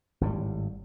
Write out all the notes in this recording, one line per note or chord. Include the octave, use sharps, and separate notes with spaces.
G#1 A2 D#3 G3